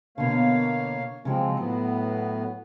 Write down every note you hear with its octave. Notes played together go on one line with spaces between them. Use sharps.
B2 D3 A#3 C#5 F5
C#3 F3 F#3 G#3 C4
A2 F#3 B3